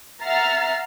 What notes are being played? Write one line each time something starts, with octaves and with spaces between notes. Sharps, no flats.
E5 F#5 A#5 F6 A6 C7